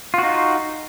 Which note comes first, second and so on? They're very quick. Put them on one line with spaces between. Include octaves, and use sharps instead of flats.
F4 F#4 D#4